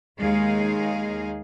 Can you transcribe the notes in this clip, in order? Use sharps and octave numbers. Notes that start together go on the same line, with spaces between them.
D#2 G#3 D#4 G#4 F5